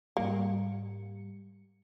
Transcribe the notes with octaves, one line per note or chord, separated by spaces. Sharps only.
G#2 G3 A#3 C#7